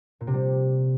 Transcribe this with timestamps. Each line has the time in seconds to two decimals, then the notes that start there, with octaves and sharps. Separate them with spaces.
0.21 A#2
0.27 C3
0.34 G3